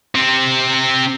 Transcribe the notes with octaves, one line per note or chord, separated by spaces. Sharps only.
C3 C4